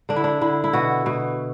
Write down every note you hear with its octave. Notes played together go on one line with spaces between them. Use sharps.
D3 D4
E4
D4
D3 E4
E4
B2 F#4
B2